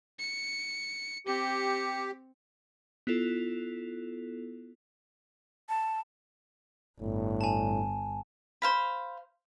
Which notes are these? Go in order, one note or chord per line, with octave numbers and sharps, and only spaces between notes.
C#7
C4 G4 C#7
B3 E4 F4 A4
A5
G1 A2
G#5 A5
C5 F5 B5